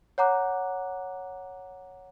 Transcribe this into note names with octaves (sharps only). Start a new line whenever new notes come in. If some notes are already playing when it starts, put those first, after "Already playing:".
C#5 F#5 A#5 D6 F#6